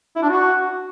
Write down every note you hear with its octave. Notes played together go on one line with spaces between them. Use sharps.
E4
D4
F#4